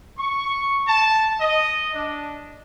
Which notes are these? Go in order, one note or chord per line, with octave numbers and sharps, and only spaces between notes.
C#6
A5
D#5
D4